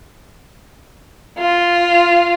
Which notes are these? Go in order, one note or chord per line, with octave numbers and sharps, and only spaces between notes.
F4